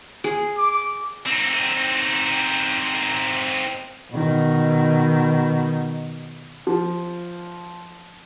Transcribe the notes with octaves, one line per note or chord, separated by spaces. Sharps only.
G#4
D6
C4 D#4
B2 D#3
F3